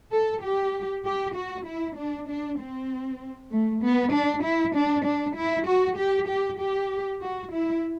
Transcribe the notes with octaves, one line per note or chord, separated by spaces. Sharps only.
A4
G4
G4
F#4
E4
D4
D4
C4
A3
B3
D4
E4
D4
D4
E4
F#4
G4
G4
G4
F#4
E4